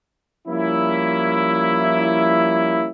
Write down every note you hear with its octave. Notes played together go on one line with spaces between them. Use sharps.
F3 G3 A#3 C#4 E4